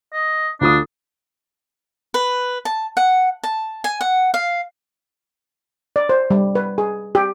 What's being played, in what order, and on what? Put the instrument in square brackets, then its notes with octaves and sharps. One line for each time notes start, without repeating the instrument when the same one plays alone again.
[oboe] D#5
[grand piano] D2 F4 D#6 [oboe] D4
[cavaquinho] B4
A5
F#5
A5
G#5
F#5
F5
[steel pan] D5
C5
G3
B4
G#4
G4